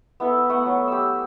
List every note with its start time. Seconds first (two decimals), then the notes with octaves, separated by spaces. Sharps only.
0.20 B3 E4 A4 B4
0.49 A3 B3 F#5
0.66 F#3
0.88 G4 E6